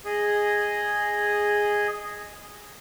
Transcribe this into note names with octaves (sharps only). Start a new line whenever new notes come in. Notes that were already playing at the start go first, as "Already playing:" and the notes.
G#4 D#5